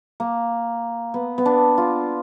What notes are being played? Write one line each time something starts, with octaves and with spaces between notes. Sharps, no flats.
A#3
B3
B3
D4
F4